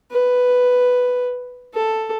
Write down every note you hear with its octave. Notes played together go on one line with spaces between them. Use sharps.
B4
A4